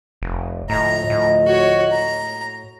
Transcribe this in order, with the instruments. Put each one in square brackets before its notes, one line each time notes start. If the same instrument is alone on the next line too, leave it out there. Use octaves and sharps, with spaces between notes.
[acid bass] F1
[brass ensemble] D2 F3 D#5 [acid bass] A2 [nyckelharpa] A#5
[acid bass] A2
[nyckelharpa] F#4 C#5
A#5